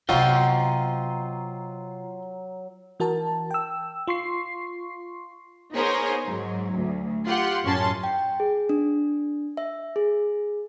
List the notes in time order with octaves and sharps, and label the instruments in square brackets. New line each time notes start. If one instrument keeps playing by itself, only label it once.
[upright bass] C3 B3 [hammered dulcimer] F#3 [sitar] F4 [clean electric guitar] C5 D#5 G5
[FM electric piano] E3 F#4 A#4 A5
G5 E6
F4 C6 C#6 C7
[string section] B3 D#4 G#4 A#4 C5 C#5
G#2 F#3
D2
F4 G4 F#5 C6
F#2 A2 C#4 A5 C6
[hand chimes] G5
G#4
D4
E5
G#4